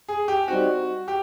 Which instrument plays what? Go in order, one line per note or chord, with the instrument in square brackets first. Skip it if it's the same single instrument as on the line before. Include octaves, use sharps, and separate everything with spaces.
[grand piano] G#4
G4
[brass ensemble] G3 C4 D#4 [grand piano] F#4
[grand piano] G4